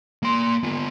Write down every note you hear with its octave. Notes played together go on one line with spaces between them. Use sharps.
A#3 C6
B3 F4